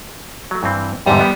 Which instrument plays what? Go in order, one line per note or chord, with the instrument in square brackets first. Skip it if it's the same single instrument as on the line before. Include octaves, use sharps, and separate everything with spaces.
[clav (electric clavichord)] F#3 A3
G2 E3 C4
[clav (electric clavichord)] E2 G#2 D3 [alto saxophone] G3
[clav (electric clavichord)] B3 G4